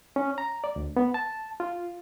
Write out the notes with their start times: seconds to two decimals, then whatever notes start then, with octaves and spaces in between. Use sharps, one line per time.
0.16 C#4
0.38 A#5
0.64 D5
0.76 D2
0.97 B3
1.14 A5
1.60 F4